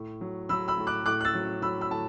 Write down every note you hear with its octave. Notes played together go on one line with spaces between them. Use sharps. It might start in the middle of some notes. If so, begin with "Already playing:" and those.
Already playing: A2
F#3
F#3 B5 E6
B5 E6
A2
D6 F#6
A2 D6 F#6
F#6
E6 A6
F#3
F#3 B5 E6
B5 E6
A2 A5